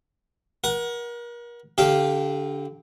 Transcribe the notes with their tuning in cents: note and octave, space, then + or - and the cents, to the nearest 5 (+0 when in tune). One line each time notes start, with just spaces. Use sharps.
A#4 +35 F#5 +0
D3 -30 G4 -10 F5 +0